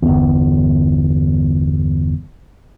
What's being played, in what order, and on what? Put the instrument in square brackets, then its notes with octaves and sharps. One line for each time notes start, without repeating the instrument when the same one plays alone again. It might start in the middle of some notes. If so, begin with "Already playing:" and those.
[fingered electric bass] G1 E2